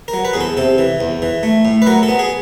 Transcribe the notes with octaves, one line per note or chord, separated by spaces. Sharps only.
A#4
F#3
B4
E2 G#4
A4
C3 A4
E3
E2
E3
A3
A2
B4
F#3 A#4
A4
B3
G#4